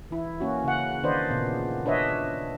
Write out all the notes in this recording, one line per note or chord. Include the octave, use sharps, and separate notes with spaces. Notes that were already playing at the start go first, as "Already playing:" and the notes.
E3 E4
A#3 C#4 F#4
C#3 F#5
D#3 D4 B4 C5 D5 D#5
A#2 C#3 B3
D4 B4 C#5 D#5 E5